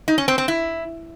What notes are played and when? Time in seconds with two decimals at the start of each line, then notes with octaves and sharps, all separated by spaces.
0.08 D#4
0.18 C#4
0.28 C4
0.38 C4
0.48 E4